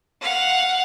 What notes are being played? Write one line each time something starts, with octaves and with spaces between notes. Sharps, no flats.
F5 F#5